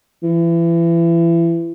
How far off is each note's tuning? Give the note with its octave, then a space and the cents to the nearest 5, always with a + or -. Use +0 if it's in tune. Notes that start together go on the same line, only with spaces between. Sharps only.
E3 +30